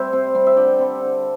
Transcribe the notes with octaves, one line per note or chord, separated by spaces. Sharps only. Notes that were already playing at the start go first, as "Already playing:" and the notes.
Already playing: G3 C4 C5 E5
C3
G3 C4
E5
D3 D5 G5
G3 C4
D3